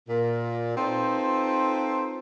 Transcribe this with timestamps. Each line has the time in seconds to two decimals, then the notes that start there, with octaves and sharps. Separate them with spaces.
0.08 A#2
0.77 C4 D#4 F4 A4 B4 C5